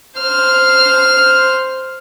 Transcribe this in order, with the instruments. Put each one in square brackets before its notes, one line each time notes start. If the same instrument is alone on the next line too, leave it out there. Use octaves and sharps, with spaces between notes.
[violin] C5 F6